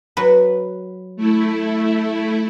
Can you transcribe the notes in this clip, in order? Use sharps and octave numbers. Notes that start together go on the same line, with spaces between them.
F#3 B4
A3 E4